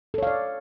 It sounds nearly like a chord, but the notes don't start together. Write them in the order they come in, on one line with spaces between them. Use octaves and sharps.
A4 C#5 F5 D5